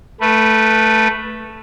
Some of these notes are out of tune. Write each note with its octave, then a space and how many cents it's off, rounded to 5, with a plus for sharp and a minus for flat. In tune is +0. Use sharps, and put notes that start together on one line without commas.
A3 +5 B4 -15